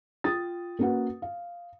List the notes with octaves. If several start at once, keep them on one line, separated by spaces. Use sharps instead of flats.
F4 G5 D#6 A6
A#3 C#4 F#4 B4 F#5
F5